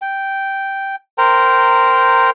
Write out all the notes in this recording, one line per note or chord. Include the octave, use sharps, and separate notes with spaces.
G5
A#4 C5 G5 A#5